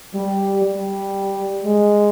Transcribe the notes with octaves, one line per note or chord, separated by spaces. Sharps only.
G3
G3
G#3